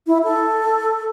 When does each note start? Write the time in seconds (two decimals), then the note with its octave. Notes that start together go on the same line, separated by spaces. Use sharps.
0.07 E4
0.24 A4